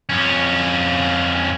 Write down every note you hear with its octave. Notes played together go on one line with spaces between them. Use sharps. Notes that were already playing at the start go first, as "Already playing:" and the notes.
F2 C#4